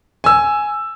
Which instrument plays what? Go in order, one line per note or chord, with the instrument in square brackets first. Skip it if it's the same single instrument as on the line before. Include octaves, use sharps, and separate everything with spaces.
[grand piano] G#5 E6